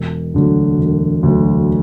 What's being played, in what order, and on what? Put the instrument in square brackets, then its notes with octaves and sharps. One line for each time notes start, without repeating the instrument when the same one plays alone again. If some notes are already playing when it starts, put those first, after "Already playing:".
Already playing: [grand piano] E1
D2 D3 F#3
E1
D2 D3 F#3